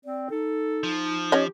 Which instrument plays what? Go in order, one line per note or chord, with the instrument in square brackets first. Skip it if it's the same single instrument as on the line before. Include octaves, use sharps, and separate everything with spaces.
[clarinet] C4 [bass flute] D5
[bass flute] D#4 [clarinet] A4
[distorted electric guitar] F3
[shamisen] C#4 C#5 D#5 [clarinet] G4